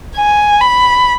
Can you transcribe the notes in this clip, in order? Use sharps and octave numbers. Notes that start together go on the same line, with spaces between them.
G#5
B5